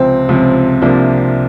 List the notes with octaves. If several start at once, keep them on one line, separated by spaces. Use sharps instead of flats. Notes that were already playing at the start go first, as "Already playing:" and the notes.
Already playing: C#2 C3 F3 C4
C#2 C3 F3
C2 C3 F3 A#3 D4